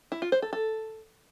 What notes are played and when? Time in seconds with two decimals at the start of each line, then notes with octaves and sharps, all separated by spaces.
0.12 E4
0.22 F4
0.32 C5
0.42 A4
0.53 A4